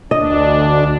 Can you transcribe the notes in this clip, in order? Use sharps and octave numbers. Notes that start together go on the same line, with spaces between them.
D2 D4 D#5